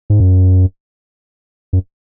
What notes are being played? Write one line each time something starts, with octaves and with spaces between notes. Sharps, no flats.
G#2
F#2
F#2